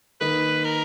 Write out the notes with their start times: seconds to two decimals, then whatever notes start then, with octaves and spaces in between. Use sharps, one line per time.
0.21 D#3 A#3 D#4 B4
0.64 A#4